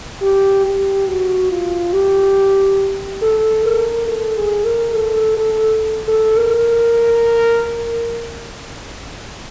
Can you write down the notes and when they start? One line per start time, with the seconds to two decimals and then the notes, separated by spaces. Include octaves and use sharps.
0.22 G4
0.65 G4
1.08 F#4
1.51 F4
1.93 G4
3.22 A4
3.65 A#4
4.08 A4
4.37 G#4
4.65 A#4
4.94 A4
5.37 A4
6.08 A4
6.37 A#4